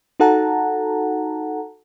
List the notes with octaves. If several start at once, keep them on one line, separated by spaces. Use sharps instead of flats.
D#4 F#4 A4 F#5 A5 A#5